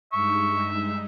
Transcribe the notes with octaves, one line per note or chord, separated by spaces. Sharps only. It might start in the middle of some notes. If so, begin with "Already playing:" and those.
G2 G#3 D#4 E5 C#6